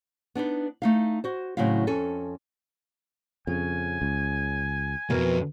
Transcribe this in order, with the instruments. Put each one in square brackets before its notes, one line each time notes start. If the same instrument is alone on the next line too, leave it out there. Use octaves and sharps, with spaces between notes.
[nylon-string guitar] B3 D4 D#4 B4
A3 D#4 F5
F#4 C5
A2 C#3 F#3 C4 E4 F5
F2 C#4 A4 G#5
[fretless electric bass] F2 [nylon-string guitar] C#3 [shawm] G#5
[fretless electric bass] C#2
[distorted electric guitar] C2 F2 [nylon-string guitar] B2 E3 A#4